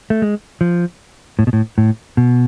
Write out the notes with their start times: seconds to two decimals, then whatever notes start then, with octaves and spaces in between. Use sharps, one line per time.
0.10 A3
0.22 G#3
0.61 F3
1.39 A2
1.47 B2
1.53 A2
1.78 A2
2.17 B2